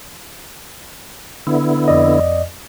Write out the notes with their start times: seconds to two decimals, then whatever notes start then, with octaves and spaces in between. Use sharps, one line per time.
1.47 D3 B3 E4
1.88 F2 D5 D#5